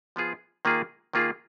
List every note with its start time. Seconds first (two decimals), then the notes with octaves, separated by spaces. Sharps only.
0.16 F3 B3 F4 G#4
0.65 D#3 A#3 F4 G#4
1.13 D#3 A#3 F4 G#4